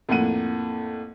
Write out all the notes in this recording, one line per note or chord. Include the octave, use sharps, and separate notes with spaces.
F2 A2 A#3 F#5 D#7